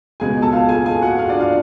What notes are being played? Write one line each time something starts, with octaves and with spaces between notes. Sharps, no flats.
C#2 B2 G#3 G#4 G#5
A4 A5
F4 F5
G#4 G#5
G#4 G#5
F#4 F#5
F4 F5
D4 D5
F4 F5